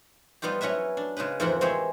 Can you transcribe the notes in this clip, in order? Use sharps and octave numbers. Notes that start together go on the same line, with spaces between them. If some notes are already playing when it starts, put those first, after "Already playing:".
G3 B3 D#4 F4 G4
F#3 C#4 E4 B4 E5
D4
C#3 G#3 D#4 B4
F2 G#2 E3 F3 A#4 F#5
G#3 C4 E4 G4 C#5